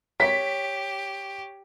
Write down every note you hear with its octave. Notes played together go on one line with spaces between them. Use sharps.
G4 C#5 B6